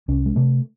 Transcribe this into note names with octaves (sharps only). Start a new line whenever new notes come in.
C2 C#4
G#3
C3 A3